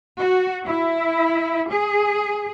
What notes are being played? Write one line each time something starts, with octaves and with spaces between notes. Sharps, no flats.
F#4
E4
G#4